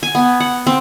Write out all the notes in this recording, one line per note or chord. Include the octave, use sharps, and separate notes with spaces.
G#5
B3
F#5
C4